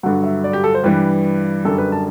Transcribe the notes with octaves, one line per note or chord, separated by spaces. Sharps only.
G2 D3 F#3 F#5
E5
D5
G4
A4
C5
G2 E3 G3 B4
F#2 D3 G3 A4
B4
A5